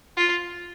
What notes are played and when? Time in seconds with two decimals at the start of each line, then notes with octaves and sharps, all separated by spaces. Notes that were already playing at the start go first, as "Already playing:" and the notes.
0.17 F4